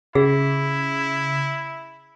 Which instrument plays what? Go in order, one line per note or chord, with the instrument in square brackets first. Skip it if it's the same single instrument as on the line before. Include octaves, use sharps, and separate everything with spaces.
[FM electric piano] C#3 [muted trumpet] E4 [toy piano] G#4